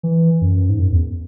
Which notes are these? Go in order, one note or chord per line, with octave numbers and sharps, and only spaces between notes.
E3
F#2
G#2
F#2
E2